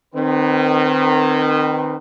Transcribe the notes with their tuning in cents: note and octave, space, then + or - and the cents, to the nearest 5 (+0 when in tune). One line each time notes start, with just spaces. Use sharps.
D#3 -25 C4 +0 B4 +0